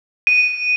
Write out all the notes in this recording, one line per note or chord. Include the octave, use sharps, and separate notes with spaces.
D#7